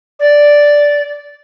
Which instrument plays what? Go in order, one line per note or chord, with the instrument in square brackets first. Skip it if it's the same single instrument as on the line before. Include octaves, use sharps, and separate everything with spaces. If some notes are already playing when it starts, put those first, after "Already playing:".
[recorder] D5